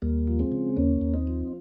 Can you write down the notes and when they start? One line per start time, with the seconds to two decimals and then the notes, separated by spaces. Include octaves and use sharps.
0.02 D#2 G3 A#3
0.27 F3
0.39 G#3 C4
0.52 C#3
0.76 D#2 A#3 C#4
1.01 D#2
1.14 C4 D#4
1.27 F3